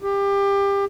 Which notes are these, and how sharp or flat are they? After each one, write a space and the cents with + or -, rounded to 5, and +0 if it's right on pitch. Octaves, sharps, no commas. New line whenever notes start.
G4 +25